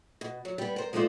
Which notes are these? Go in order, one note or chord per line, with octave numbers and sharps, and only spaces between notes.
B2
F#3
G3 B3
A#4 C5
F3 G#3 A3 D#4 C5 D5